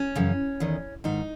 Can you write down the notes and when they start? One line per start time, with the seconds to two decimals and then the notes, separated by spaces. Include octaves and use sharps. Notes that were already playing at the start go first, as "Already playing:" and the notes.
Already playing: C#4
0.15 F#2 C#3 E3
0.60 E2 D#3
1.04 G#2 D#3 D#4